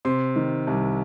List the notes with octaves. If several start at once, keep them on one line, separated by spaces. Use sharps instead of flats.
C3 C6
D#3
C2